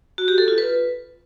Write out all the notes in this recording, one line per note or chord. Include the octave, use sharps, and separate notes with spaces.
F#4
G4
A4
F4
B4